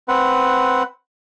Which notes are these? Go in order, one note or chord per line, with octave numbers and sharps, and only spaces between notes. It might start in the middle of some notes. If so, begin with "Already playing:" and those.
C4 B4 F#5